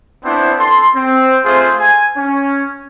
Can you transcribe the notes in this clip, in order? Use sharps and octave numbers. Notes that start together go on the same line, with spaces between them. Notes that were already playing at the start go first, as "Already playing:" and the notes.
B3 C4 D4 E4 C5
A4 A5 C6
C4
A3 F4 G#4 C5
G#5
C#4